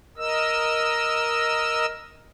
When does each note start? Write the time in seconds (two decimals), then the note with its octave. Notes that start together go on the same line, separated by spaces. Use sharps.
0.17 A#4 D#5 E6